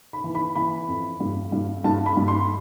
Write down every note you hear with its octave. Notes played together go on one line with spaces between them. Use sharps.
B5
E3
B5
E3 B5
F2
G2
G2
G2 A5
B5
G2
C6